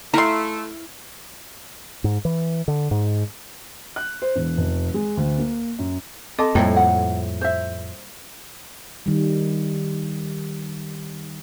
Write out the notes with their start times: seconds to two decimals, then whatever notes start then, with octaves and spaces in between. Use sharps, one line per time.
0.14 A3 E4 F5 A#5 C6
2.04 G#2
2.25 E3
2.68 D3
2.91 G#2
3.96 F#6
4.22 C5
4.36 E1
4.57 F1
4.94 G#3
5.17 D2
5.38 A#3
5.79 F#2
6.39 C4 A4 D#5 A5 D6
6.55 F2 A2 G3 A#3 G5
6.76 F#5
7.41 C5 E5
9.06 D#3 G3